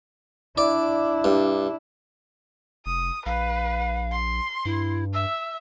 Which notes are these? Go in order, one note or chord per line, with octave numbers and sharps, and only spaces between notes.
D4 E4 D5
G2
F1 D#6
A#1 B4 F5
C6
G2 E4
E5 E6